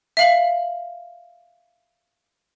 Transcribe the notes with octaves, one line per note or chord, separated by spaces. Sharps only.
E5 F5 F#7